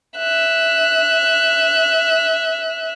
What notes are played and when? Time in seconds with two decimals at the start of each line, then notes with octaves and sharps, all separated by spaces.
0.18 E5 F#6